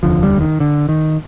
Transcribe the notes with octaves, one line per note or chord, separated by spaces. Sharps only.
F1 D#2 D3 F3
G3
D#3
D3
D#3